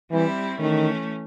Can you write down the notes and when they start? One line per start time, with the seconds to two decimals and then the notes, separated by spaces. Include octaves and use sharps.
0.10 E3 G3 C4 E4
0.59 D#3 E3 A3 C#4